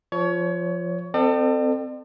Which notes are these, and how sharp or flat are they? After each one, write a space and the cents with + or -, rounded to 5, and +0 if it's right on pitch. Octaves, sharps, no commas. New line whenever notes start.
F3 -5 C#5 +25
C4 -15 A4 +25 D5 +45